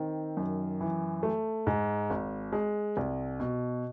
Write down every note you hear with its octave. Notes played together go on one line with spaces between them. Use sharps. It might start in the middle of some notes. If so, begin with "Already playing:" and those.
Already playing: D#3 C4
F#2
E3
A3
G#2
G#1
G#3
C2
B2